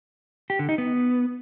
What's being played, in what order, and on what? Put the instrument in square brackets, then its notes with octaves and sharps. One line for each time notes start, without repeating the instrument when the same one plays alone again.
[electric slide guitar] G4
D3
D#4
B3